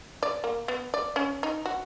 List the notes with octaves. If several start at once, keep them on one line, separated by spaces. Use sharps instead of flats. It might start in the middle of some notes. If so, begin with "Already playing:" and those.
D5
A#3
B3
D5
C#4
D#4
F#4